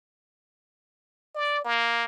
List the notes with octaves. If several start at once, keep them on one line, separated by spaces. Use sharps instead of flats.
D5
A#3